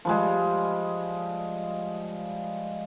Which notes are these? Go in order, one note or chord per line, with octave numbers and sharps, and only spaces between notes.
F3 G3 G#3